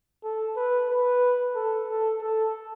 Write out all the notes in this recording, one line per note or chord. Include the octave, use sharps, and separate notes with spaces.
A4
B4
B4
A4
A4
A4